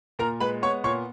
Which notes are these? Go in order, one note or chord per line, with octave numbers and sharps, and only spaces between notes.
A#2 A#4 A#5
G#3 B4 B5
B3 C#5 C#6
A#2 C#5 C#6